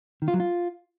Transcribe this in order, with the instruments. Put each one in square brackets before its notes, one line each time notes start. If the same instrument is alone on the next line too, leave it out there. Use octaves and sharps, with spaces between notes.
[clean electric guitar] D#3
F4
F#3
F4